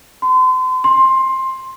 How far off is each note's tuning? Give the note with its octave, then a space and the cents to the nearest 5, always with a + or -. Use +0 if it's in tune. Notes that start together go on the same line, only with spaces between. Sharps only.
C6 -35
C6 +15